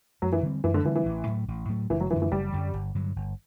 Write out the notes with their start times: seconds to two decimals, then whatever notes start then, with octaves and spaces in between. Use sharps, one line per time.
0.22 F#2 F#3
0.32 E3
0.43 D3 G3 C4
0.64 F#2 E3
0.74 D3
0.85 D3 E3 G3 C4
0.95 E3
1.06 A1
1.27 A2 F#3 A3
1.48 A1
1.69 A2 F#3 A3
1.90 F#1 E3
2.00 F#3
2.11 F#2 D3 E3 F#3
2.22 E3
2.32 F#1 G3
2.52 F#2 D3 F#3
2.73 G1
2.95 G2 D3 F#3
3.16 G1